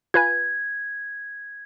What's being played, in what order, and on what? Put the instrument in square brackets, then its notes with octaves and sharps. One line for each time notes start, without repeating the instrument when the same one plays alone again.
[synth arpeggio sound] F4 B4 G#5 [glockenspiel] G#6